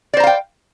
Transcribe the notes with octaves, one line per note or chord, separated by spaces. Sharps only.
C5 D5 F5 G5 A#5